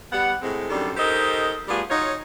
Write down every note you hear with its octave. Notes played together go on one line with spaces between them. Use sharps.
G3 B3 G4 F#5
A2 C3 G#3 C4
F#2 D#3 G3 C4 D4 A4
D#4 G4 A4 A#4 C5 D#5
G3 A3 B3 F4 G#4
D#4 F4 F#4 C#5